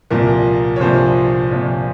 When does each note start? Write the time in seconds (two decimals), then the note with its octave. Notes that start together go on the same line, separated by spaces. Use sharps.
0.10 C2 A#2 F3 A#4
0.76 C#5
0.80 C2 A#2 F3 C5
1.51 C2 A#2 F3 C#5